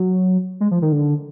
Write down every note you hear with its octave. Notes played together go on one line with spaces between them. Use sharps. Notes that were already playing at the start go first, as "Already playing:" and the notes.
Already playing: F#3
G#3
F3
D#3
D3